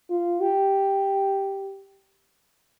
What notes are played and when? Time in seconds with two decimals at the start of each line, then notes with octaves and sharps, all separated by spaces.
0.10 F4
0.41 G4